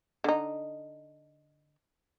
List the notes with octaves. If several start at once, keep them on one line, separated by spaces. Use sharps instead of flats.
D3 D#4